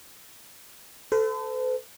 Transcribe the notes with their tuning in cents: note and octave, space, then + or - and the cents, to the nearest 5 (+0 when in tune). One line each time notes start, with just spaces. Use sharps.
A4 +0 C5 -45